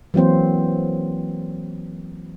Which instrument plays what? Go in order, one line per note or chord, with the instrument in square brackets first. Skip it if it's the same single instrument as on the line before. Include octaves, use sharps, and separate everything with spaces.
[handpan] E3 F#3 A#3 C4 C5